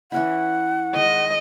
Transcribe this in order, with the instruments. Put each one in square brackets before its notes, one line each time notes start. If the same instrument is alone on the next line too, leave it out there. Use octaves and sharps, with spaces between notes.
[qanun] E3 C#4 E4 [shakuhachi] F#5
[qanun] D#3 G#3 [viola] D#5